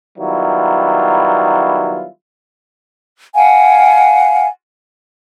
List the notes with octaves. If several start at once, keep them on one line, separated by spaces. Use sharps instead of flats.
D#3 F#3 G3 B3 E4 F4
F5 F#5 G#5